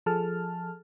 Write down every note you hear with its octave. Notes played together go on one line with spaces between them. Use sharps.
F3 G#4 A4 A5 F6